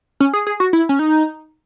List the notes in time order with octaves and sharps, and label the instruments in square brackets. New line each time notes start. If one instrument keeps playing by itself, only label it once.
[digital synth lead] C#4
G#4
G#4
F#4
E4
C#4
D#4